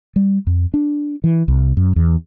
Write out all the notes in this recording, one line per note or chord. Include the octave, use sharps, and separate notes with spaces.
G3
F2
D4
E3
C2
F#2
E2